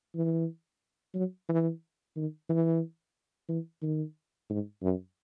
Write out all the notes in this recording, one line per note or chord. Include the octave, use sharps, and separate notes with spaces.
E3
F#3
E3
D#3
E3
E3
D#3
G#2
F#2